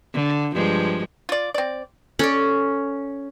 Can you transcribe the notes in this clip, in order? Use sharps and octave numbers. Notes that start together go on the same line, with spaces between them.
D3
G2 F3 G#3
F4 D5
C4 D5
C#4 A4 D5